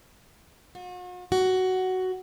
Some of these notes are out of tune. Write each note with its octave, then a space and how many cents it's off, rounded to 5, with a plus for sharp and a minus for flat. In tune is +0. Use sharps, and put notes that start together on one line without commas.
F#4 -45
F#4 +10